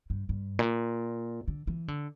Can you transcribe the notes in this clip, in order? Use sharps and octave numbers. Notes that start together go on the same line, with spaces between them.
G2
G2
A#2
D3
E3
D3